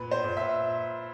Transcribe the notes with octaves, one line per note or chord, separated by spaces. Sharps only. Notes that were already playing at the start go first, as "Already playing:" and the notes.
Already playing: A#2 B4
C5
A#2
E5